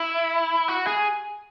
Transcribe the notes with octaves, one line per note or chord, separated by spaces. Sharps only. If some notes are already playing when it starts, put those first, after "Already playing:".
Already playing: E4
F#4
G#4